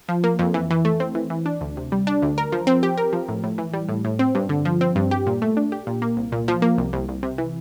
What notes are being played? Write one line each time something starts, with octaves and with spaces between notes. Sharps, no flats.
F3
A#3
F2
E3
E3
A3
C4
E3
E3
D4
D2
C3
G3
D4
D2
A#4
F3
C4
G4
A#4
F3
A2
A2
E3
G3
A2
A2
C4
G2
D3
F3
C4
G2
G4
A#2
A3
D4
G4
A#2
A#3
C2
A#2
F3
A#3
C2
C2
C2
C3
E3